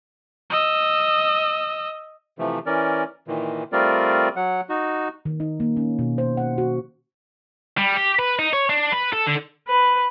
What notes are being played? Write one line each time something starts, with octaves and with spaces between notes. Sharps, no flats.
D#5 E6
C3 E3 F3 A3
E3 C#4 A#4 D5
A#2 D#3 E3
G3 A3 C4 F4 A#4 D5
F#3 F#5
D#4 F#4
D#3
D#4
A#3
C#4
B2
C5
F#5
F#4
G3
G4
B4
D#4
C#5
D4
B4
A4
D3
B4